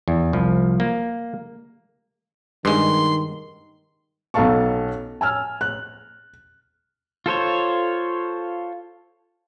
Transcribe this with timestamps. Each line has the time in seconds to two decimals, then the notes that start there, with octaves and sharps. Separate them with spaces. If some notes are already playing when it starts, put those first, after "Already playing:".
0.08 E2
0.33 C2 F3
0.80 A#3
2.65 G2 D#3 G#3 C6
4.34 B1 C#4 A4 F5 A5 C#6
5.21 G#5 E6 F6
5.61 F#6
7.26 F4 A4 C5 C#5